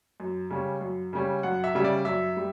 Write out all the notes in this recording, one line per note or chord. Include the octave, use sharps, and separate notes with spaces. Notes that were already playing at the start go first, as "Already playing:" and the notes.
F#2
C#3 G3 C#4
F#2
C#3 G3 C#4
F#2 F#5
E5
C#3 G3 C#4 E5
D5
F#2 E5
G3